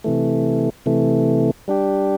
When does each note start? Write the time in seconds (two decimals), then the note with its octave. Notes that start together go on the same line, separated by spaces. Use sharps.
0.04 C3 E3 A3
0.86 C3 E3 A3
1.68 G3 D4 G4